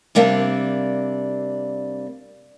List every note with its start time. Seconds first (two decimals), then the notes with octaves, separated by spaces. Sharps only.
0.15 C3 G3 A#3 C4 D4